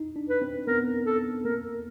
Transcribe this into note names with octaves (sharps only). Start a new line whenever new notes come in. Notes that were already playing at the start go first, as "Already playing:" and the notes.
Already playing: D#4
D4
B4
C4
B3 A#4
A4
A#3 A#4